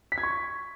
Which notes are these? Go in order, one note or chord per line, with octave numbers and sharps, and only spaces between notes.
B6
G#6
C#6